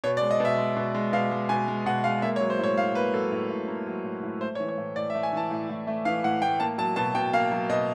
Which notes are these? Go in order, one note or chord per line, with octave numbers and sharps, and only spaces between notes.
B2 C#5
D5
G#3
D#5
B2 E5
G#3
B2
G#3
B2 F5
G#3
B2 G#5
G#3
B2 F#5
G#3 F5
A#3 E5
C#5
F#3
C5
A2 C#5
A2 F5
A#3 B4
F#3 A4
A2
A2
A#3
F#3
A2
A2
A3 C5
C#5
E3
C#5
A2
A2 D5
E5
A3
G#5
E3 A5
A2
A2
A3
E3 F5
A2 F#5
A2 G5
A#3 A5
F#3 A5
B2 A5
B2 G5
A#3 F5
F#3
B2 D#5